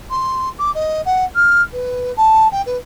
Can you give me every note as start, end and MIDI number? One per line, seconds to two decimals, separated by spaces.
0.10 0.49 84
0.58 0.71 86
0.74 1.01 75
1.05 1.24 78
1.35 1.62 89
1.73 2.12 71
2.17 2.47 81
2.51 2.61 79
2.66 2.76 71